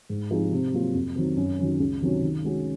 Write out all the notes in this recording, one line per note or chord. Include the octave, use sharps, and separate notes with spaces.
G#2
F3 C4 D#4 G#4
C3
F#3 A#3 F4
F2
D#3 F#3 C4
F#2
D#3 F#3 C#4
C#2
C3 D#3 F#3 C#4
D#3
G#3 C#4 F#4